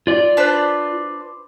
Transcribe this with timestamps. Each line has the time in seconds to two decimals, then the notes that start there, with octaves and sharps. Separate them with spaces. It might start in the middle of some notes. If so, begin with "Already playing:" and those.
0.07 F4 D5
0.37 D4 B4 C5